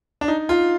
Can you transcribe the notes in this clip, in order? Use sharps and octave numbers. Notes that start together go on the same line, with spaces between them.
D4
D#4
F4